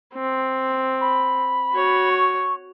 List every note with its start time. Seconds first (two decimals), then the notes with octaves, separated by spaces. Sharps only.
0.14 C4
1.01 B5
1.72 F#4 C#5
2.12 C#6